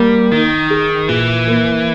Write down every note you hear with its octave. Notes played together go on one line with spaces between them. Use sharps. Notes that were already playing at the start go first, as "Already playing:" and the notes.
Already playing: G3 A#3
D#3 D#4
G#4
A#2 E3
A#3